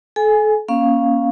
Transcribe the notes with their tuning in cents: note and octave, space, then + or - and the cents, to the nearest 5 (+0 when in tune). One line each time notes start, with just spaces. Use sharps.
A4 -35 G#5 +0
A#3 +35 C#4 +0 F5 +0